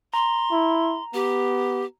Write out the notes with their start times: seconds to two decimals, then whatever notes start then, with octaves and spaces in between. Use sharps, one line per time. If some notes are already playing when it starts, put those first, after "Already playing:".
0.14 A#5 C6
0.51 E4
1.14 B3 G4